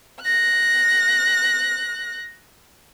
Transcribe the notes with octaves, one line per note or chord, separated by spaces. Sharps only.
F#6 A#6